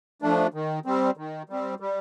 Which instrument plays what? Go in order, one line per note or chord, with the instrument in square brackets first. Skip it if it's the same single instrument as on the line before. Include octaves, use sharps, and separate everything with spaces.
[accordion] F3 A3 D4
D#3
G3 C4
D#3
G3 C4
G3